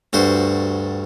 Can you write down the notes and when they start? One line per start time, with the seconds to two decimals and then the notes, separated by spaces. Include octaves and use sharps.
0.13 D2 G2 F#4 C5